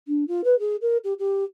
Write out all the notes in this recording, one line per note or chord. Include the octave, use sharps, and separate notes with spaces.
D4
F4
B4
G#4
A#4
G4
G4